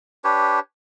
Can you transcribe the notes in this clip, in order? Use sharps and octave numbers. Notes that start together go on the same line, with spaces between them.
D4 G4 B4 C#5